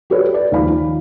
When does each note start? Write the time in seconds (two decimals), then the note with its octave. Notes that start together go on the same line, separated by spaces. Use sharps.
0.10 F#4 G4 A4 B4 C#5 D5
0.34 D5
0.52 D#2 D#3 F3 F5 B5
0.70 D#3